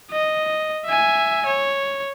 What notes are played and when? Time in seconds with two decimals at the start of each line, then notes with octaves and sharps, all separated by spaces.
0.11 D#5
0.85 E5 G#5
1.46 C#5